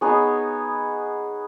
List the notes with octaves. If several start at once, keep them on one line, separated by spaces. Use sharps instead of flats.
B3 D#4 G#4 C#5